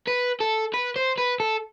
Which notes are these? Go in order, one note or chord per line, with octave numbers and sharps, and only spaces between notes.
B4
A4
B4
C5
B4
A4